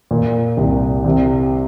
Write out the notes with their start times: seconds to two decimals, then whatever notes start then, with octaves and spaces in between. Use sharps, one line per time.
0.11 A#2
0.57 C2
1.05 C3